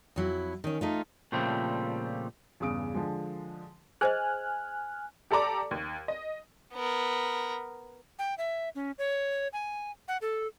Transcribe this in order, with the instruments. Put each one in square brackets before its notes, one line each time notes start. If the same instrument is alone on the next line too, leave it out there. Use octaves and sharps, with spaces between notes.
[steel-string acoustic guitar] F2 F#3 E4
D#3 C#4
A3 D#4 F4
[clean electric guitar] A#2 C#3 F3 G3 A3 C4
[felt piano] E2 G2 C#3 D#6 D7
D3 F3 G#3
[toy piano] G#4 C5 D#5 [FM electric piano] G#5 F6 F#6
[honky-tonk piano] G4 A4 D5 A#5 D6
D#2
D#5
[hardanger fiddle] B3 A#4
[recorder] G5
E5
C#4
C#5
G#5
F#5
A4